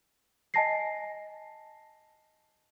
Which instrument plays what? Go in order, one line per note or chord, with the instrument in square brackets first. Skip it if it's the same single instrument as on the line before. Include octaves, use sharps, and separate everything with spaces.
[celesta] D#5 G#5 A5 A#6 C7